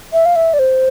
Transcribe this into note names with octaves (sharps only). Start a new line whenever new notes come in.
E5
F5
E5
D5
C5